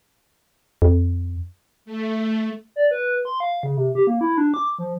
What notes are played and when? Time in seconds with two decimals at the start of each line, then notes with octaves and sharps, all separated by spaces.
0.82 F2
1.85 A3
2.76 D5
2.91 B4
3.25 C6
3.40 F5
3.63 C#3
3.77 C3
3.95 G4
4.07 A#3
4.21 E4
4.38 D4
4.54 D6
4.79 F3